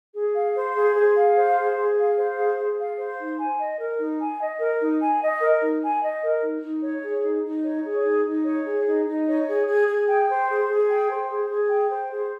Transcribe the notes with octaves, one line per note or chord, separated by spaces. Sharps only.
G#4
F5
C5
G#4
G#4
F5
C5
G#4
G#4
F5
C5
G#4
G#4
F5
C5
D#4
G#5
D#5
A#4
D#4
G#5
D#5
A#4
D#4
G#5
D#5
A#4
D#4
G#5
D#5
A#4
D#4
D#4
C#5
G#4
D#4
D#4
C#5
G#4
D#4
D#4
C#5
G#4
D#4
D#4
C#5
G#4
G#4
G#4
G5
C5
G#4
G#4
G5
C5
G#4
G#4
G5
C5
G#4